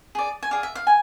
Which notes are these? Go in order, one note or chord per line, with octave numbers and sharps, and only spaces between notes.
G#4 D5
G#5
G#4 D5 F5
E5
F5
G#5